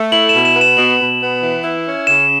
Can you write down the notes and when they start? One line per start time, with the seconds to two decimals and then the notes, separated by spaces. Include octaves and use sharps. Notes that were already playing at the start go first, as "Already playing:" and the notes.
Already playing: A3
0.12 E4 F#7
0.29 B2 E7
0.45 E7
0.55 B3
0.61 E7
0.77 B2 F#7
0.99 B2
1.21 B3
1.42 E3
1.64 E4
1.86 C#4
2.07 C#3 E7